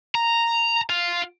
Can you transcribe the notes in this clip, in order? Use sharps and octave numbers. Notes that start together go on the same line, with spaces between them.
A#5
F4